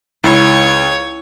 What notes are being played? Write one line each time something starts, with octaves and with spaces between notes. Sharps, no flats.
C#2 E4 C#5